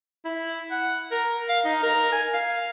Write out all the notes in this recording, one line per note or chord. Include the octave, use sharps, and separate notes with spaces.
E4
F#5
A#4
F5
D#4
A#4
G#5
F5